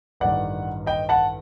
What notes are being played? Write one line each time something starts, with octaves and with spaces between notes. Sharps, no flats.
A1 G2 D#3 D5 F#5
D#5 G5
F#5 A5